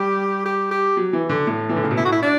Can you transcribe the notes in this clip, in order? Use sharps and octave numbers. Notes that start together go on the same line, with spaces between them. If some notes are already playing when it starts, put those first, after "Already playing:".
Already playing: G3 G4
G4
G4
F#3
E3
D3
A2
E3
D3
C#3
B2
A2 E4
F#4
E4
D4